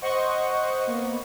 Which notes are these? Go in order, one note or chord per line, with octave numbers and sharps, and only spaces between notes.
C5 D#5 F#5 C#6
A#3 B3